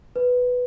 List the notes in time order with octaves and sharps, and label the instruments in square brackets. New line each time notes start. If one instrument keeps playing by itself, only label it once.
[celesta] B4